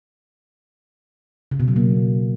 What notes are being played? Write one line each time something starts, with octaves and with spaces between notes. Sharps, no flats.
C#3
B2
F#3
A#3